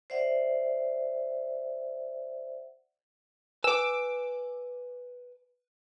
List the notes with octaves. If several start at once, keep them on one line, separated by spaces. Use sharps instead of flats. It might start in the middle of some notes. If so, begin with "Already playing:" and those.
C5 D5 E5 F#5
B4 G#5 D6 E6